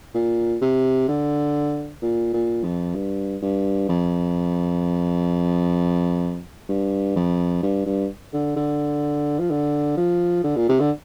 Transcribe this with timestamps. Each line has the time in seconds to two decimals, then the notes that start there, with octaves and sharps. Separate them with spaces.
0.14 A#2
0.61 C3
1.08 D3
2.02 A#2
2.33 A#2
2.64 F2
2.95 G2
3.42 G2
3.89 F2
6.69 G2
7.16 F2
7.63 G2
7.86 G2
8.33 D3
8.56 D3
9.39 F3
9.50 D3
9.97 F3
10.44 D3
10.56 A#2
10.69 C3
10.80 D3